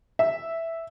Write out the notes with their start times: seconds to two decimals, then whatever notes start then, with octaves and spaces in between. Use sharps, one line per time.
0.19 E5